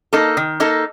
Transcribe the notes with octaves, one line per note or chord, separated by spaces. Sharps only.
A#3 D#4 A4
D#3
A#3 D#4 A4